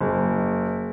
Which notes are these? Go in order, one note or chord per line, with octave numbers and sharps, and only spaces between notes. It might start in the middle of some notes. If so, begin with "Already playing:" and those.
F#1